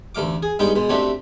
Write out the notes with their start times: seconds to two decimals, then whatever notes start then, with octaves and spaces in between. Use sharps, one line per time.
0.15 A1 D2 A3 F5 D6
0.43 G#4
0.59 G2 G#3 B3 D#4 G5
0.76 B2 G#3
0.89 C3 A3 C4 D4 F#4 G4